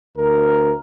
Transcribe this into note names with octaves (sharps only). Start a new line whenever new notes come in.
D2 A#4